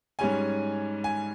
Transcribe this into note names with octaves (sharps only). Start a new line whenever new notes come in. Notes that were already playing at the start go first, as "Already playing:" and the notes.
G#2 G3 C#4 G#5
G#5